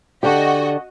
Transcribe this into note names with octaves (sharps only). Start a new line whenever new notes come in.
D3 F#4 G4 D#5